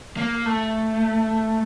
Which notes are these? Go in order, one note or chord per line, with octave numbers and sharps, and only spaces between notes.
A#3
A3